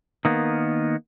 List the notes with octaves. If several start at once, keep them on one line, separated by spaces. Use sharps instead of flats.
D#3 A#3 B3